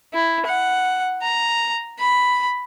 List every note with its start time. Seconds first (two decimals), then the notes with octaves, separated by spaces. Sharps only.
0.14 E4
0.46 F#5
1.23 A#5
2.00 B5